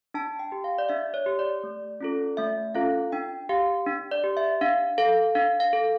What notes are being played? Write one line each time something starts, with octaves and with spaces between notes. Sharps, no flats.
D4 A5
G5
G4
F5
D5
D4 E5
C#5
G4
D5
A3
C#4 F4 A4
A3 E5
C#4 F4 A4 F5
D4 G5
G4 F5
D4
D5
G4
E5
D4 F5
A4 F5
D4 F5
F5
A4